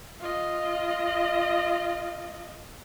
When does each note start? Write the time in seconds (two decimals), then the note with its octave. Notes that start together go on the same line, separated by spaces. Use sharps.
0.21 F4 D#5